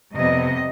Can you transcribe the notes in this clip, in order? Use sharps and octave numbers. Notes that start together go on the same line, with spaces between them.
F2 C3 G3 B3 D#5